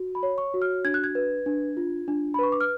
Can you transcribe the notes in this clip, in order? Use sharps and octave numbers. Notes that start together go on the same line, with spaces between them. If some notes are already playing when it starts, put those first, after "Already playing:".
Already playing: F#4
B5
C#5
C#6
F#4
F6
D4 G#6
F#6
G#6
B4
D4
F4
D4
B5
B4 C#6
D6
F6